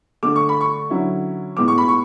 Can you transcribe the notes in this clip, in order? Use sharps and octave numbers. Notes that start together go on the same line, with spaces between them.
D3 A3 D4 D6
C#6
B5
C#6
D3 F#3 C#4 E4
A2 G#3 B3 D6
C#6
B5
C#6